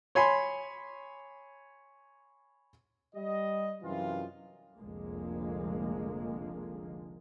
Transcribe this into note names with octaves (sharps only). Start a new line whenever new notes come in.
C#5 G#5 B5 C6
G3 D#5
F#2 C3 E3 F4
F1 C2 D3 F3 G#3 A#3